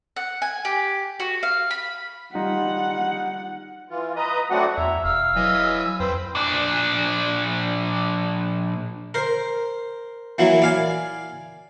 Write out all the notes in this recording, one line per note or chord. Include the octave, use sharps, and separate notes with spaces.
F#5
G#5
G4
F#4
F5
B5
G3 D#4 F4 F#5
E3 F4
B4 D#5 A#5 D#6
F#3 A3 C4 D4 F#4 F#5
E2 E5 A#5
E1 F5 E6
E3 F#3 D#5 G#5
F2 B4 C5 G5
A#2 D4
A#4 C5
E3 F#3 A#3 E4
D5 F5 G#5